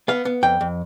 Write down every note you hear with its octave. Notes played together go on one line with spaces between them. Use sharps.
B3 F5
B3
F2 G5
F2